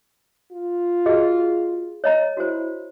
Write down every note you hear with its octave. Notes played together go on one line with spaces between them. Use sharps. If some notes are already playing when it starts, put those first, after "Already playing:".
F4
F#4 G#4 D#5
C#5 D#5 A#5
E4 F#4 C5